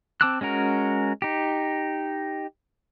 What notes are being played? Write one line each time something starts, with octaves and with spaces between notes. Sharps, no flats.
C4 A5 D6 E6 F#6
G#3 C#4 F#4 A#4
D#4 G4